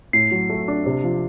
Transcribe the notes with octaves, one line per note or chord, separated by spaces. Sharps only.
A2 C7
F#3
A3
D4
C3
F3